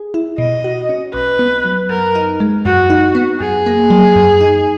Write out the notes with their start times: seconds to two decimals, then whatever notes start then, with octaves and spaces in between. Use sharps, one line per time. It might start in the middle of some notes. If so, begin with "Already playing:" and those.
Already playing: G#4
0.14 E4
0.38 B2 D#5
0.64 F#4
0.89 C#4
1.14 B1 B4
1.39 B3
1.65 F#3
1.89 F#2 A#4
2.15 D#4
2.40 G#3
2.65 F#2 F#4
2.90 D#4
3.15 B3
3.40 F#2 G#4
3.66 A#3
3.90 F#3
4.16 F#2
4.41 D#4